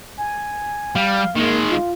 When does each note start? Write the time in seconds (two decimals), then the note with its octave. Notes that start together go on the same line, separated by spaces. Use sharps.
0.18 G#5
0.95 G3 F5
1.36 D#3 G#3 A#3
1.70 F4